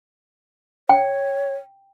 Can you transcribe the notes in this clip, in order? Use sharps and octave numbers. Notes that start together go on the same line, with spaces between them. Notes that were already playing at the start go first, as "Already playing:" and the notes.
C#5 G5